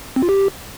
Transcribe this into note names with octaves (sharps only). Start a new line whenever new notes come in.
C4
F4
G4